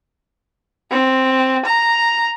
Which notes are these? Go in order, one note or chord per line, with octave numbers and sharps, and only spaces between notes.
C4
A#5